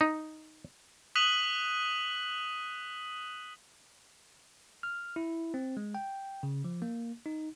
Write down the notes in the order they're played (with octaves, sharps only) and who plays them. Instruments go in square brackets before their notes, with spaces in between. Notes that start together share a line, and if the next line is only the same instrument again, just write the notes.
[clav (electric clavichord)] D#4
[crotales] D#6 F#6 B6 D#7 F#7
[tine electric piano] F6
E4
C4
G#3
G5
C#3
F3
A#3
D#4